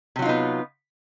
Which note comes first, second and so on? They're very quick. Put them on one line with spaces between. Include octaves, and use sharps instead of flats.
C3 F#3 F4 D#4 B3